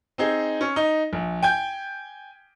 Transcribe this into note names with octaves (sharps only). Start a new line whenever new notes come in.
C4 D#4 G#4
C#4
D#4
A#1
G5 G#5 G6